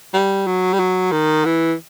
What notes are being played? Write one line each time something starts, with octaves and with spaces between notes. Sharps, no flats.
G3
F#3
G3
F#3
D#3
E3